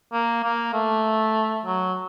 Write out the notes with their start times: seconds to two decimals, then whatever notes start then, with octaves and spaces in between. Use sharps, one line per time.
0.13 A#3
0.44 A#3
0.74 A3
1.66 F#3